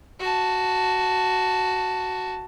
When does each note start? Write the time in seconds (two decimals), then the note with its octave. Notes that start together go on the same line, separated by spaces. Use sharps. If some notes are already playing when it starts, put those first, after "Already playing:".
0.20 F#4 A5